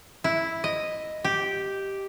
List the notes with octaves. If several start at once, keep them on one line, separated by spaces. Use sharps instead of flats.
E4
D#5
G4